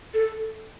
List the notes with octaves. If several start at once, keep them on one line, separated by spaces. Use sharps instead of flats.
A4